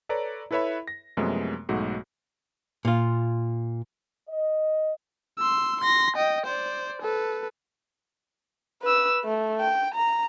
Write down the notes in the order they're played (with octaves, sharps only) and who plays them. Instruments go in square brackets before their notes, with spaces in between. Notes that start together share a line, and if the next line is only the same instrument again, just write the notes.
[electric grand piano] A4 B4 C#5 D5 A#5
E4 A4 B4 C#5 E5 B5
A#6
F#2 C3 F3 G#3 A3 B3
B1 G#2 A3 F#4
[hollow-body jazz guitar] A#2 F4
[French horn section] D#5
[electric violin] C6 E6
C6 A#6
D#5 G5
C5 D5
A4 B4
[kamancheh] B4 E6
A3
G5
A#5